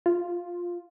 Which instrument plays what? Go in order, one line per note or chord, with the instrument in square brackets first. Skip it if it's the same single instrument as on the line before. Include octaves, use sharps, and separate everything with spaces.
[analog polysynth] F4